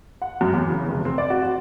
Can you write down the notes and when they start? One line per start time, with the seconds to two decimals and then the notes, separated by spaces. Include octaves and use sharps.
0.22 F#5
0.41 F#2
0.53 E2
0.70 C#3
0.89 F1
1.05 C4
1.18 D5
1.30 F#4
1.42 F#4